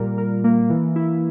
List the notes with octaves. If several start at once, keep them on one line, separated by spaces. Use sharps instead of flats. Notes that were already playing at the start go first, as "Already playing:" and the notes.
Already playing: A#2 G3 A#4
A#4
A#3
E3
E4